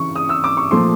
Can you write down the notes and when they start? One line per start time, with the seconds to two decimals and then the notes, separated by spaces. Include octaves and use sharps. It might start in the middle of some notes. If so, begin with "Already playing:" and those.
Already playing: C#3 E3 C#6
0.15 D#6
0.29 E6
0.44 D6
0.57 C#6
0.71 A#2 F3 A3 C6